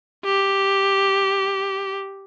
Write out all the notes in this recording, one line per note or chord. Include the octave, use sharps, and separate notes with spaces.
G4